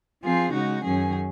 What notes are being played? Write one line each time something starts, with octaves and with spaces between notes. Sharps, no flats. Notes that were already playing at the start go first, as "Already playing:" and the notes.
F3 C4 F4 G#4
C#3 G#3 D#4 F#4
F#2 D#3 F#3 C#4 G#4